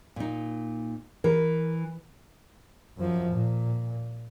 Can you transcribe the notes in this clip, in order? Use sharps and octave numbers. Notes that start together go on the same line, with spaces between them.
A#2 D#4
E3 A#4
F#2 F3
A#2